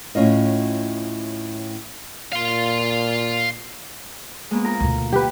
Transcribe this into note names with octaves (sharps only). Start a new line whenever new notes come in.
A2 C#4 F4 D#5
A#2 F5 C6
G#3 A#3 B3
F4 A#4 A#5
D2 B2
G4 B4